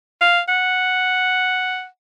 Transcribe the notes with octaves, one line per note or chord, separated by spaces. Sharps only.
F5
F#5